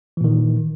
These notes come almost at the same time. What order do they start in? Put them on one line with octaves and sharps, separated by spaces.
E3 A#2 D#3